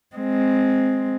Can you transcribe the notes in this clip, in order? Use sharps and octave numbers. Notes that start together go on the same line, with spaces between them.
G#3 C4